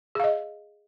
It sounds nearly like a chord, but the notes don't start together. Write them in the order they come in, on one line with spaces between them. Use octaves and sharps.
G#4 F5 D#5